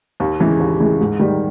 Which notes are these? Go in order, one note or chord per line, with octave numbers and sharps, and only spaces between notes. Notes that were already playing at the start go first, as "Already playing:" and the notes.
D#2
C#3 E3 G#3
D#2
C#3 E3 G#3
G#2
D#3 G3